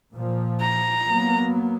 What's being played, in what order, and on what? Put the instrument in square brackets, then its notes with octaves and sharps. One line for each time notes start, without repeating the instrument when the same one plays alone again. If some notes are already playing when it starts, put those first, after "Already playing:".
[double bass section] A#2 F3
[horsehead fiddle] A#5
[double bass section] F#3 A#3 B3